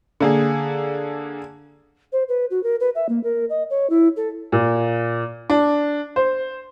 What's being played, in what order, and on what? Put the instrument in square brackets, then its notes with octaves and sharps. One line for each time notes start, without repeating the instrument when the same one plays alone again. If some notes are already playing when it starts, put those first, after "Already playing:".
[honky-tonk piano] D3 A#3 G#4
[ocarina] C5
B4
F#4
A#4
B4
E5
A#3
A#4
D#5
C#5
E4
A4
[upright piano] A#2
D4
C5